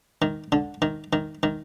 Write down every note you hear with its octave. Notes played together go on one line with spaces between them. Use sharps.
D#3
D3
D#3
D#3
D#3